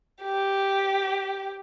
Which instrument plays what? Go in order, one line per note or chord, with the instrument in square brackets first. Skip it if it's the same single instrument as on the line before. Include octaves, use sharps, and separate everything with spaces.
[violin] G4